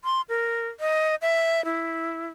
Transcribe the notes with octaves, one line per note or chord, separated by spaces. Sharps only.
C6
A#4
D#5
E5
E4